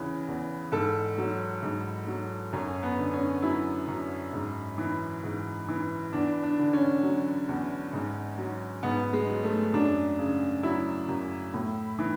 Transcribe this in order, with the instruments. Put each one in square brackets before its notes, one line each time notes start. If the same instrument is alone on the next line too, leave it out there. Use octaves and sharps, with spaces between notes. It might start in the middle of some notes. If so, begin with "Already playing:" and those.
Already playing: [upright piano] E2 C#3 E3
E2
G#2 A4
F#3
G#2
F#3
F#2 C#4
B3
D3
C#4
F#3 E4
F#2
G#2
E3
G#2
E3
E2 D4
D4
D3
C#4
F#3
E2
G#2
F#3
G#2 B3
G#3
F#3
A3
F#2 D4
C#3
F#3 E4
F#2
A2
E3